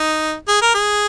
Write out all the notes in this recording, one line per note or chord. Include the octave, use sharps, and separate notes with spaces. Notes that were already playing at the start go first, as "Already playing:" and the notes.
Already playing: D#4
G#4
A#4
G#4